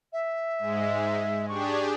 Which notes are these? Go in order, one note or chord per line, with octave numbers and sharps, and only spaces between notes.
E5
G#2 G#3
D4 G4 G#4 C#6